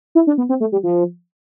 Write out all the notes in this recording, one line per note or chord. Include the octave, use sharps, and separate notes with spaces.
E4
D4
B3
C4
A3
G3
F3